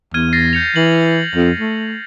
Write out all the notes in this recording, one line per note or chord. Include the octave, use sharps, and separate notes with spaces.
E2 F6 G#6 D#7
A6 A#6 C7
G6 C#7 F7
E3 F#7
F2
A3